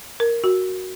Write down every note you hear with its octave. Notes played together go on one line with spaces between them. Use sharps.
A#4
F#4